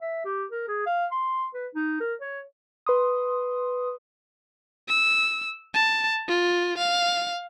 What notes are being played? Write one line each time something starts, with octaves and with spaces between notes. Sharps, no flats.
E5
G4
A#4
G#4
F5
C6
B4
D#4
A#4
C#5
B4 C6 D#6
E6
A5
F4
F5